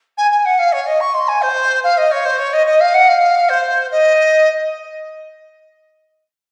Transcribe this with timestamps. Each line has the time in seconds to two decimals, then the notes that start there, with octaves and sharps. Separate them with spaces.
0.18 G#5
0.31 G#5
0.45 F#5
0.59 F5
0.73 C#5
0.87 D#5
1.00 C#6
1.14 C6
1.28 G#5
1.42 C5
1.84 F5
1.98 D#5
2.11 C#5
2.25 C5
2.39 C#5
2.53 D#5
2.67 D#5
2.80 F5
2.94 F#5
3.08 F5
3.49 C5
3.91 D#5